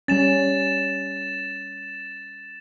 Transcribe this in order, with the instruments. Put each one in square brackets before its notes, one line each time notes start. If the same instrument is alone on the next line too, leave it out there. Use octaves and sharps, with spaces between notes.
[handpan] G3 C#4 [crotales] A6 E7